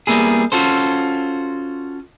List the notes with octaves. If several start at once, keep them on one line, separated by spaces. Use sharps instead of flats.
G3 A#3 B3 E4 G#4
C#4 F4 F#4 A4 C5